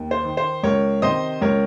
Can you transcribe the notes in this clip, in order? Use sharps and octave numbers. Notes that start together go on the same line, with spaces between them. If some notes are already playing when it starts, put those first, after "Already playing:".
Already playing: D#2
C5
D#3
C5
C#2 A#4 C#5
C3 D#3 C5 D#5
C#2 A#4 C#5